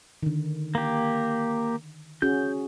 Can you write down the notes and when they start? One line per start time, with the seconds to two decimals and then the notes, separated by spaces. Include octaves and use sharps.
0.23 D3 D#3
0.75 A#3 G4
2.22 C#4 F#4 G#4 G6